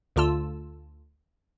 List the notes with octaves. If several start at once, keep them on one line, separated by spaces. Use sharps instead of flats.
D2 D3 F4 A5 E6